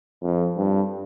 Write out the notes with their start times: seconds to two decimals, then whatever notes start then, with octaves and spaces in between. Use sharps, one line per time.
0.22 F2
0.57 G2